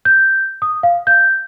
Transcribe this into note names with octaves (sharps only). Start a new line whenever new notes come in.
G6
D#6
F5
G6